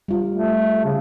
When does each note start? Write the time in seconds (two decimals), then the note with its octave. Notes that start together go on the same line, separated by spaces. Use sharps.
0.08 G3 F4
0.34 A3
0.85 C#3